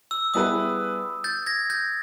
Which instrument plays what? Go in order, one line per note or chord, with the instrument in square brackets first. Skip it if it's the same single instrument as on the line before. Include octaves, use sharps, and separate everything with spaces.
[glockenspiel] E6
[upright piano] G3 B3 E4 G#4 B4 [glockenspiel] D#6
[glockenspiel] G6 A6
G#6 A#6
G6 A6